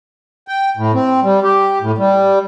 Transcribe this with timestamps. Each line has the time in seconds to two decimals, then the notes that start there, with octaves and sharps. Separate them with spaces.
0.48 G5
0.77 A2
0.94 C4
1.23 G3
1.43 G4
1.81 A2
1.98 G3